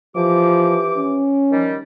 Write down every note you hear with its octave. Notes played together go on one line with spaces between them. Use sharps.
E3 F3 G4 D6
C#4
D#3 F3 G3